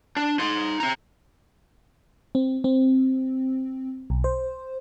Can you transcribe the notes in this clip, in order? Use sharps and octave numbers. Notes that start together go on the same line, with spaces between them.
D4
D#4 C6
C4 A#5
C4
C4
B1
C5